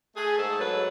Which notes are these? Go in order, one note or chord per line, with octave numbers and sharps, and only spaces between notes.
A3 G#4
G#2 A4
F#3 B4